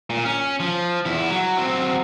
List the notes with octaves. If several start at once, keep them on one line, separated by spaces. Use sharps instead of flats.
A#2
C#4
F3
E2 E4
F#3
F#3 C4